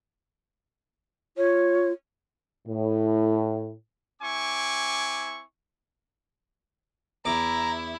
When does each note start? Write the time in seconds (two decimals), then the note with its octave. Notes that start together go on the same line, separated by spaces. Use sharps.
1.37 F4 C#5
2.68 A2
4.22 C4 E4 G#5 C#6 D6
7.25 E2 E4 A#5 D6